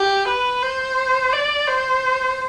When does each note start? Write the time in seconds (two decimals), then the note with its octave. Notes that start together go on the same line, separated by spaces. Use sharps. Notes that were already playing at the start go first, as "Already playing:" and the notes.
Already playing: G4
0.28 B4
0.63 C5
1.33 D5
1.68 C5